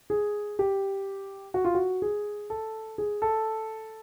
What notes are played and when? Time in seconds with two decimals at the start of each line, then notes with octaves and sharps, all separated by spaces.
0.10 G#4
0.59 G4
1.54 F#4
1.65 F4
1.74 F#4
2.02 G#4
2.50 A4
2.98 G#4
3.22 A4